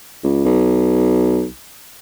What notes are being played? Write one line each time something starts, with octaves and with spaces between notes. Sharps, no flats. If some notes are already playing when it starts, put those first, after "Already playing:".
C#2
B1